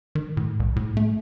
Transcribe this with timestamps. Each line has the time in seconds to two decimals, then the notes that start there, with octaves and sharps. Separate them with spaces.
0.15 D#3
0.37 A2
0.60 C2
0.76 A2
0.97 A3